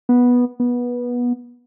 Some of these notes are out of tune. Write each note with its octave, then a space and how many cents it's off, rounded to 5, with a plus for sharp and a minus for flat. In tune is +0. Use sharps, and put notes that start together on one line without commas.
B3 -10
B3 -20